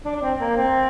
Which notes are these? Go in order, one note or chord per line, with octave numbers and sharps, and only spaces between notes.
D4
D4
C4
A#3
C4